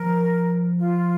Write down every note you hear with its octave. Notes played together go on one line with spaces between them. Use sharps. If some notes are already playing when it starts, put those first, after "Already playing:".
Already playing: F3 A#4
F4